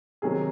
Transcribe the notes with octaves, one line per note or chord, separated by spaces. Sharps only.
C3 D#3 F#3 G#4